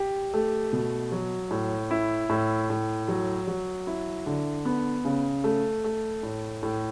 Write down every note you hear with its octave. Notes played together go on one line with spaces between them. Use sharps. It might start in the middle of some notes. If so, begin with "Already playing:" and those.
Already playing: G4
A3
B2
F#3
A2
E4
A2
A2
F#3
F#3
E4
D3
B3
C#3
A3
A3
A2
A2